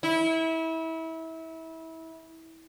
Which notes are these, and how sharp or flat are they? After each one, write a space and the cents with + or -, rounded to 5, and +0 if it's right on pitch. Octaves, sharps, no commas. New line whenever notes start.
E4 -25